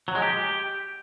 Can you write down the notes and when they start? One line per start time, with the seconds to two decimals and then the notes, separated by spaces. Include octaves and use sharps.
0.08 F#3
0.15 G#3
0.22 G4